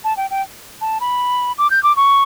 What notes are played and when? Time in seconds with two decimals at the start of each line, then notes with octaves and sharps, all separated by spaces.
0.04 A5
0.17 G5
0.31 G5
0.81 A5
1.01 B5
1.58 D6
1.70 G6
1.83 D6
1.96 C#6